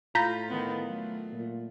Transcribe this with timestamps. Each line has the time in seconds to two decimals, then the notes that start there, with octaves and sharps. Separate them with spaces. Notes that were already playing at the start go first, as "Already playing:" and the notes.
0.15 A2 F4 A#5 B5 G6
0.49 D#3 B3
0.84 F#3 A3
1.33 A#2